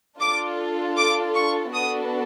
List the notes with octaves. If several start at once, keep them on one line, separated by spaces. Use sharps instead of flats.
D4 F4 A4 D6
D6
C#6
B3 D4 F#4 A4 D#6